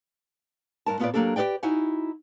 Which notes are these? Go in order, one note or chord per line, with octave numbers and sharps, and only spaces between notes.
G2 A#4 A5
A#2 B3 F4 G4 B4 D5
F#3 G3 A#3 D4 G4 A4
G4 A4 B4 D5 G5
D#4 E4 F#4 F#5 G#5